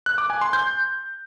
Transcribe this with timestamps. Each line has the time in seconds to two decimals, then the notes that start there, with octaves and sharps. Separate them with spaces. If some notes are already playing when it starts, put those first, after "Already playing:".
0.06 F#6
0.18 D6
0.30 G#5
0.41 C6
0.53 G6